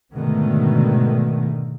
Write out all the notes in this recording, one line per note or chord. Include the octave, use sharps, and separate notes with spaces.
G#2 B2 D3 D#3 A3